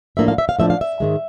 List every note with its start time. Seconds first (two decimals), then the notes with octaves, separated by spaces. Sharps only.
0.17 A2 F3 A#3 D4 E5
0.28 F5
0.38 E5
0.49 F5
0.59 A2 F3 A#3 D4 E5
0.70 F5
0.81 E5
1.00 G#2 D#3 G#3